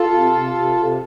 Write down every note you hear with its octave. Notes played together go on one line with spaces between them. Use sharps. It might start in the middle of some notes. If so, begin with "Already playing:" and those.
Already playing: F4 A4
C3
C3
C3
C3